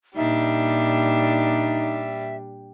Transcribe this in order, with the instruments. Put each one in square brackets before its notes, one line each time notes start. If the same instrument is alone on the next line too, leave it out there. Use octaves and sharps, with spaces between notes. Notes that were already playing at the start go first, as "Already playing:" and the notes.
[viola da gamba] A#2 D4 [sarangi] G3 [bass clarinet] D#4 [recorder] E5